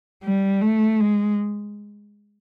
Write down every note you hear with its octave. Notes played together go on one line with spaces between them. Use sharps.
G3
A3
G#3